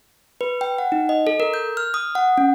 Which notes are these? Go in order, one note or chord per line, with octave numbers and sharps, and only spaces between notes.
B4
G5
F#5
D#4
D#5
A4
A#4
G6
F6
D#6
F#5
C#4